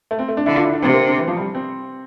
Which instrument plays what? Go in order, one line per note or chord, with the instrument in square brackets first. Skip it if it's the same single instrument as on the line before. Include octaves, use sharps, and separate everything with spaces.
[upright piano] A3
C4
A3
D4
[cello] D3 [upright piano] E4
[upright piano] F4
E4
D4
[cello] C3 [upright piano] C4
[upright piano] A#3
D3
E3
F3
G3
C4